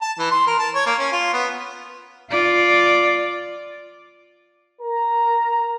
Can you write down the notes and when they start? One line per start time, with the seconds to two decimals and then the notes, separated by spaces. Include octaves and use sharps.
0.02 A5
0.19 E3
0.31 C6
0.47 A#4
0.59 A5
0.75 C#5
0.86 A#3
0.99 C#4
1.12 F4
1.33 B3
2.30 F4 D5
4.82 A#4 A#5